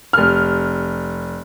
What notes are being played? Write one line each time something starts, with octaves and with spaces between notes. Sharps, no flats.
F1 F6